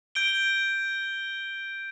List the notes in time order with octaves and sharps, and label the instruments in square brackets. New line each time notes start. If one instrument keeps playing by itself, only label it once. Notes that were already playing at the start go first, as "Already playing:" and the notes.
[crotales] G6 D7 G7